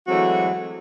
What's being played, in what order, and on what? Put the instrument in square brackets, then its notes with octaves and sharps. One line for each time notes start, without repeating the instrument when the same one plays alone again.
[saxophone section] E3 F#3 G#3 A3 C4 F#4